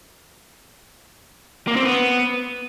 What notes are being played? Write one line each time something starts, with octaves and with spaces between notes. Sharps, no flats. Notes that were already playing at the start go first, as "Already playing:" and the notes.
A#3
C4
B3